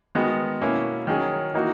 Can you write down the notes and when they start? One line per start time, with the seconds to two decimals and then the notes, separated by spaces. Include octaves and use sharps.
0.15 D#3 G#3 B3 F#4
0.61 B2 A#3 C#4 E4
1.07 D#3 F#3 C#4 G#4
1.53 E3 A#3 D#4 F#4